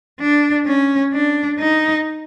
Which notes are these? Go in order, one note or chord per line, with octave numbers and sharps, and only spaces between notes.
D4
C#4
D4
D#4